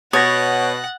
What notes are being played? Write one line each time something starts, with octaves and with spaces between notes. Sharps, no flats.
B2 C#5 F#5 D#6 A6 A#6